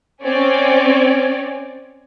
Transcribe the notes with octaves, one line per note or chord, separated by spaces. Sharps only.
C4 C#4 C#5 D5 G#5